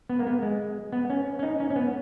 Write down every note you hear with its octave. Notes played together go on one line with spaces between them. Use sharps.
B3
A#3
B3
G#3
B3
C#4
C#4
D#4
C#4
C#4
B3